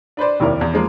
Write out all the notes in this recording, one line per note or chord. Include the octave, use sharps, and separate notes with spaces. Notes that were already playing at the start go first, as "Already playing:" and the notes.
D4 B4 C5 D5
F1 D#2 E4 A#4 D5
E2
F3 G#3 A#3